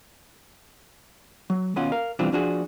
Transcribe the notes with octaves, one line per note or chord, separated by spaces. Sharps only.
F#3
D#2 B2 C#4 F4 F#5
A#4 F5
B2 E3 G3 C4 D4 F4
F3 D4 F#4 G#4